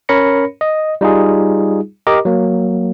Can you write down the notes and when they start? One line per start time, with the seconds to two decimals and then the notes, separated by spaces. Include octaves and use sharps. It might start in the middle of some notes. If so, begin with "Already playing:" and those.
0.09 C#4 A#4 C#5 B5 A#6 C#7
0.61 D#5
1.01 G3 D#4 F4 G#4
2.07 G4 A#4 D#5 A#5 D6
2.25 F#3 A#3